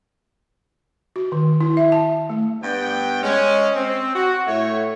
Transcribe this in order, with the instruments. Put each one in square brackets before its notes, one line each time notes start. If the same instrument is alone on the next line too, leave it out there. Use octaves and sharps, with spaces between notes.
[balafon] F#4
D#3
E4
E5
A5
A3
[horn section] G2 B3 G5
G#3 C#4
C4
F#4
A2 A3 C#5